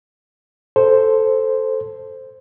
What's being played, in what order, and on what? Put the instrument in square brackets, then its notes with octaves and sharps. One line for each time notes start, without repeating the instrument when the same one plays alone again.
[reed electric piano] A4 C5